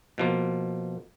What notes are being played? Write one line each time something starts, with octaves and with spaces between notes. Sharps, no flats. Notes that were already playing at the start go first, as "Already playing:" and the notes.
B2 F3 A#3